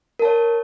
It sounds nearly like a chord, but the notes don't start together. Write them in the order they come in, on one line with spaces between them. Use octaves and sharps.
A#4 A5 C#5